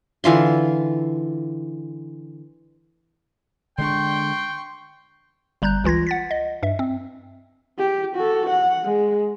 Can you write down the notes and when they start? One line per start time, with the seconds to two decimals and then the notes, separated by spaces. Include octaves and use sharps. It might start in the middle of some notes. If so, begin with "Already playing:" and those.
0.24 D3 E3 F4 C6
3.78 D3 G#3 D4 G5 C6 C#6
5.62 G1 G3 A#5 F#6 G6
5.84 C#2 E3 F4 G#6 A#6
6.07 F#5 A6 B6
6.31 D#5
6.63 G2 E5
6.79 C4
7.79 G4
8.16 F#4 A4
8.50 F#5
8.84 G#3